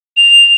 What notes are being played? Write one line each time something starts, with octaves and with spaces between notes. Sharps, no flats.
F7